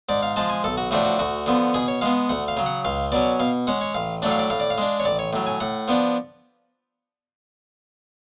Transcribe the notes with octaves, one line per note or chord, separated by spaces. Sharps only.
G#2 D5
F5
F3 G#3 A5
G#5
B1 A4
F#4
A2 F3 A3 D4 F#4
F#4
D2 F#4
D3 F3 B3
B2 G#4
C#5
G#3 B3 F5
D2 F#5
F5
C#3 F#3
F#5
C#2 F5
B2 F#3 C#4 D5
B2 F5
G#3 C#4 F#5
C#5
A1 F5
A2 F#3 A3 D4 D5
F5
D5
A2 F5
D5
F5
G#3 D4
C#5
A1 D5
C#5
A2 F#3
G#5
A2 F#5
F3 B3 D4